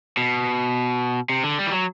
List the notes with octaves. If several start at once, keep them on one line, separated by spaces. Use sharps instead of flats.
B2
C3
D3
G3
E3
F#3